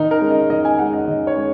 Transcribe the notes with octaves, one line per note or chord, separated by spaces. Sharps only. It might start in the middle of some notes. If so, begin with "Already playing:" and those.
Already playing: D#3 D#4
A#4
G#3 C#4
D#5
D#3 D#5
G#5
G#3 C#4 F#5
D#5
D#3 D#5
C#5
G#3